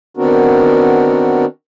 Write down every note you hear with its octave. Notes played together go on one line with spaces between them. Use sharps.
D#3 B3 C4 D4 F#4 A#4